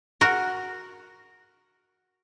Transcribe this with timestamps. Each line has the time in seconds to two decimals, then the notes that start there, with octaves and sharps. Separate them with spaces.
0.21 F#4 A#4